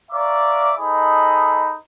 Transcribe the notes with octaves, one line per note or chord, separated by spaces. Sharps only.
D5 E5 F5 A#5 C#6 D6
D#4 G#4 A4 C5 D#5 B5